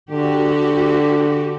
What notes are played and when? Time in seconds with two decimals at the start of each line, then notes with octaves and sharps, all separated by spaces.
0.11 D3 F#4 G4